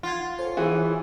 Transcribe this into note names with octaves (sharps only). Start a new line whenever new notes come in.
F4 F5 F#5 G#6
A4 C5 C#5 G#5
E3 E4 F#4 G#4 C#5